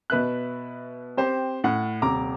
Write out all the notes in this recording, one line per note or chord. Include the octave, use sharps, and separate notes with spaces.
B2 B4 E5 F#6
C4 G4 C5
A2 F#5
D#1 C3 A#5 D6